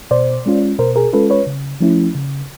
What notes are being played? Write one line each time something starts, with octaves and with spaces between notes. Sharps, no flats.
B2 C5 D5
G#3 C#4 F4
B2 A#4 C5
G#4 A#4
G#3 C#4 F4 A4 B4
B4 C#5
C#3
F3 A3 C#4 E4
C#3